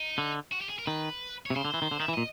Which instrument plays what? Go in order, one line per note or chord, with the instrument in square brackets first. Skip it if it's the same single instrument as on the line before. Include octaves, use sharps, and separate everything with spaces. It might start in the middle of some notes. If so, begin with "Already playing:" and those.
Already playing: [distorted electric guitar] D#4
[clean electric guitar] D3
[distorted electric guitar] F#4
G4
G#4
A#4
[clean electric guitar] D#3 [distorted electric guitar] B4
[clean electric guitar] C3 [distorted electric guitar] C#5
[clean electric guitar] C#3 [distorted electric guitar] C5
[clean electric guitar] D3
E3
D#3
D3
[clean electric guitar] D#3 [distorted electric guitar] E5
[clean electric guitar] E3
[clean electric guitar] A#2 [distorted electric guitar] D#5